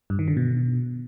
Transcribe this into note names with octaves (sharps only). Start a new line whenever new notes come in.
G2
D#3
D3
B2